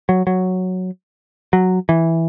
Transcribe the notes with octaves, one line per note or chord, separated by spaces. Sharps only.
F#3
F#3
F#3
E3